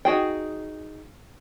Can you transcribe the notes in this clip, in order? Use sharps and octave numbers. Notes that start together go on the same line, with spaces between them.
D#4 F#4 G#4 G5